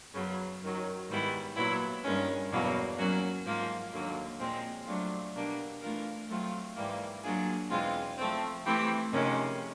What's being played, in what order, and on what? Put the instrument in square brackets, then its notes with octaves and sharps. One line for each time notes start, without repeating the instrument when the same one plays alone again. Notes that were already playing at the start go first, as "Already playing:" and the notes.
[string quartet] F#2 C#3 F#3 B3
F#2 D#3 F#3
G#2 D#3 G3 B3 E4
A#2 F#3 B3 E4
G2 D#3 G#3 C#4
E2 B2 F#3 A#3
F#3 A#3 C#4 F#4
G#2 F3 A#3
D#2 D3 F#3 A#3
A#2 F3 G#3 C4
F#3 A3 D4 F4
B2 G3 A#3 D4
E3 A3 D4 F4 A#4
F#3 A3 C4 F4
G#2 E3 G3 A#3
F#3 A#3 D4 F4 G#4
E2 B2 G#3 C4 F4
F3 A3 C4
E3 A3 C4 E4 G4
F2 C3 D#3 G#3 C#4